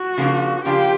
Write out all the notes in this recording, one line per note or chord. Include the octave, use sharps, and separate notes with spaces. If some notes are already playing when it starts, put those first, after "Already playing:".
Already playing: F#4
C#3 F3 A#3 D4 F4
C#3 F3 A#3 D4 F4 G4